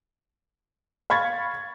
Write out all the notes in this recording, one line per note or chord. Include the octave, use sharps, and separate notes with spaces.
F5 B5 C#6 G#6 A6